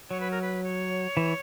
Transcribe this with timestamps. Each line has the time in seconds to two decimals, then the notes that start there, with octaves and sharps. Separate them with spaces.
0.10 F#3 C#5
0.20 B4
0.31 A#4
0.42 B4
0.64 C#5
1.17 E3